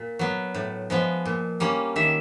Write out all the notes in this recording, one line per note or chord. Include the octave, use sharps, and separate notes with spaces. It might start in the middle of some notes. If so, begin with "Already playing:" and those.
Already playing: A#2
F#3 B3
A2
F3 G#3 B3
A#2
G3 A#3 C#4
D#3 E5